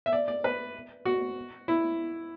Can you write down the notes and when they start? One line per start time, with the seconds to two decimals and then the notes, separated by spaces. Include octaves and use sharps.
0.06 E5
0.13 D5
0.28 D5
0.44 B4
1.05 F#4
1.68 E4